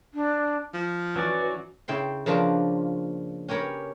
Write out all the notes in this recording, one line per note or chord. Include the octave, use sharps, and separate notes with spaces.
D4
F3
E3 F#3 C#4 F#4 B4 D5
C#3 E4 G5 C6
C#3 F3 A#3 D4 F4
C#4 G4 A#4 C#5 B5